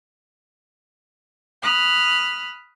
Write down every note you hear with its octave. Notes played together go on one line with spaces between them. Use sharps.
B5 D#6 F6 F#6